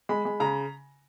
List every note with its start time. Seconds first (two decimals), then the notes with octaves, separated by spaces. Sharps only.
0.09 G#3 B5
0.25 G#3
0.40 C#3 A#5